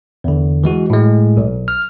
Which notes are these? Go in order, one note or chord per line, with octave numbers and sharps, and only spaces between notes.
E2 D3
E3 G#3 F#4
A2 G#3
B1
F6